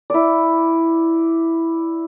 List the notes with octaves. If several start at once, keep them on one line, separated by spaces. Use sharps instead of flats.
E4 D5